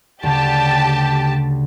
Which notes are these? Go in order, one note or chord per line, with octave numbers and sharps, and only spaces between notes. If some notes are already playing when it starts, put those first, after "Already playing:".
D2 C#3 G4 A5